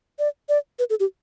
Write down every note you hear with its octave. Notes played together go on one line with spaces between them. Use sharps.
D5
D5
B4
A4
G4